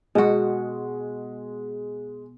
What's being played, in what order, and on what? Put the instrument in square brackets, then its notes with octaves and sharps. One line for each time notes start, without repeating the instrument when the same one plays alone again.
[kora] B2 F#4 [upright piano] G#3